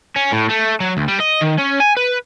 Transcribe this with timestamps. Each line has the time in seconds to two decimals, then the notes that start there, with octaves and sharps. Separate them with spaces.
0.16 C#4
0.32 A2
0.49 A3
0.80 F#3
0.97 D2
1.08 G3
1.20 D#5
1.42 D#3
1.58 C#4
1.80 G#5
1.97 B4